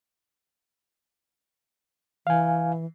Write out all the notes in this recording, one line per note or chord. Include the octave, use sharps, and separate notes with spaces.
E3 F5 G#5